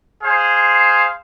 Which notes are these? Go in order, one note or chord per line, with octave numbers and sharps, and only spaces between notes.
G#4 C5 F5